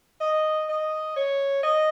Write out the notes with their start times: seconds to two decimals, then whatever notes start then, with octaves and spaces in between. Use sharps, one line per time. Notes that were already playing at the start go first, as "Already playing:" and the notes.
0.21 D#5
0.69 D#5
1.16 C#5
1.63 D#5